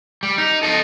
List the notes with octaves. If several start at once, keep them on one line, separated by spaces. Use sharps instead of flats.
G3
D#4
A4 D#5